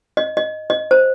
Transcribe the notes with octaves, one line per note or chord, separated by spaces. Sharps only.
D#5
D#5
D#5
C5